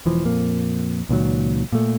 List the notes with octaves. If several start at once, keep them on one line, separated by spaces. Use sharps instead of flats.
E1 E3 F3
F2 A#2 A#3
C#2 A#2 D#3 F#3
A#2 A3